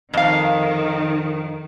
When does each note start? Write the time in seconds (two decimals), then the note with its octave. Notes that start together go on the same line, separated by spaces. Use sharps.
0.13 F2 D#3 F5